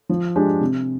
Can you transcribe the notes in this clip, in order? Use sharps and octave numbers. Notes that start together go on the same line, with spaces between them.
F3
G#3 D4 G4
C3